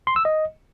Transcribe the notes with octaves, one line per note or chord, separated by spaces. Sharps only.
C6
E6
D#5